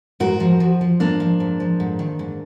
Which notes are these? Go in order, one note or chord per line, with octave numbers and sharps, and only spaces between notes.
G#2 F#4 A#4
F3
F3
F3
G#2 A#3 D4
F3
G#2
F3
G#2
D#3
G#2